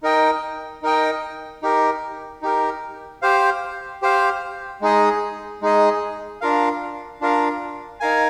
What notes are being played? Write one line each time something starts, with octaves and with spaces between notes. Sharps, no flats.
D#4 A#4 D#5 G5
D#4 A#4 D#5 G5
D#4 G4 A#4
D#4 G4 A#4
G4 C5 F5
G4 C5 F5
G#3 D#4 G#4 D#5
G#3 D#4 G#4 D#5
D4 F4 A#4 F5
D4 F4 A#4 F5
D#4 A#4 F5 G#5